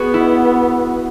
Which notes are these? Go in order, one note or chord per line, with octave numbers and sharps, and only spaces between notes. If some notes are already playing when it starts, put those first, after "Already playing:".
Already playing: B3 F#4 G#4
E4